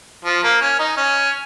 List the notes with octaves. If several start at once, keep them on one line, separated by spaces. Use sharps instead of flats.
F3
A#3
C#4
D#4
C#4